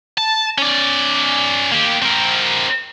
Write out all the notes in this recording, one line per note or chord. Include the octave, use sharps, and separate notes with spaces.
A5
C#4 D5
A#3 G4
C4 A#4